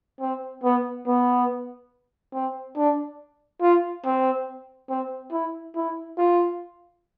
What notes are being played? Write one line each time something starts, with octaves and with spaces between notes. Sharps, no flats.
C4
B3
B3
C4
D4
F4
C4
C4
E4
E4
F4